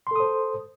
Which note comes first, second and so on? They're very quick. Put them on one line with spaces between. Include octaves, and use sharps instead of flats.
C6 A4 D#6 C5